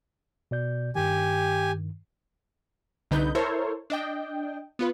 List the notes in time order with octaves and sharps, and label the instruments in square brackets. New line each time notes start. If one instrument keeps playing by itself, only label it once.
[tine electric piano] B2 D5 G6
[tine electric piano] G2 D#3 [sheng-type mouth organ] G4 G#5
[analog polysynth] C2 D3 D#4 B4 G6
E4 A4 A#4 C5 C#5
D4 D#5 G5
B3 F4 B4